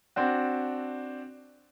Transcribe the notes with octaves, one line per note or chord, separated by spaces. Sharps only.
C4 D4 F#4